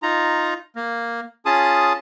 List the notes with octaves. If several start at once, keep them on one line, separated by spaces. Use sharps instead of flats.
D#4 F4 A#5
A#3
C#4 F4 G#4 A5 D#6